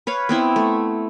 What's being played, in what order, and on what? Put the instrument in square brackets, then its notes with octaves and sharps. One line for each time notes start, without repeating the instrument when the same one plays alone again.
[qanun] B4 C#5 F5
B3 C4 E4
A3